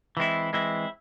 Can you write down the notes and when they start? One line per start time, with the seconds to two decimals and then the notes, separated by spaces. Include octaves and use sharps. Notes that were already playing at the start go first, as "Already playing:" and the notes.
0.17 E3 G#3 C4 E4
0.53 E3 G#3 C4 E4